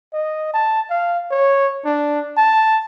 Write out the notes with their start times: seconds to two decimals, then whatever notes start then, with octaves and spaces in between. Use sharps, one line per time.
0.13 D#5
0.54 A5
0.90 F5
1.30 C#5
1.85 D4
2.37 A5